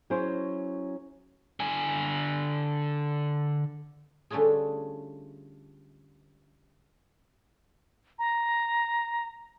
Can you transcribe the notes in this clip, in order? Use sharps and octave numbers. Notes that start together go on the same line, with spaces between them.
F#3 C#4 E4 G#4 C5
D3 G#5
D3 G3 A3 C#4 F4 G#4
A#5